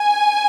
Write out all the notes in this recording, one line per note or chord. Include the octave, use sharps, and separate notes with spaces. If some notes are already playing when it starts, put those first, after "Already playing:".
Already playing: G#5